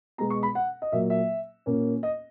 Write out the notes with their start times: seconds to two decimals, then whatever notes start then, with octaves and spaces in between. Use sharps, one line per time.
0.18 B2 G#3 B3 A#5
0.30 C#6
0.43 B5
0.55 F#5
0.82 D#5
0.92 A#2 F#3 A#3 E5
1.10 E5
1.66 A#2 A#3 C#4
2.03 D#5